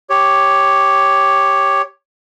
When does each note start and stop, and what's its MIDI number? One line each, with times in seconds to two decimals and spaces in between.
0.10 1.82 67
0.10 1.82 73